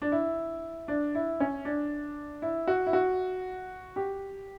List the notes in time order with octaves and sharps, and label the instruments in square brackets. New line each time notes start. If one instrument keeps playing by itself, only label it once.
[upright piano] D4
E4
D4
E4
C#4
D4
E4
F#4
E4
F#4
G4